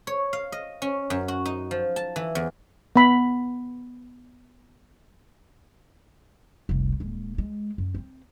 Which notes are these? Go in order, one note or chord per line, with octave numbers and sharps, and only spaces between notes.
C#5
F5
D#5
C#4
F#2
F#4
D#4
F3
A5
E3
E2
B3 B5
F1 C2
D#1 G#3
G#3
F#2
C4 C#4